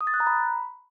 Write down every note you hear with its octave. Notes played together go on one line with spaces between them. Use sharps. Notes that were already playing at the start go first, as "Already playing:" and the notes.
D#6
A6
F#6
A#5
B5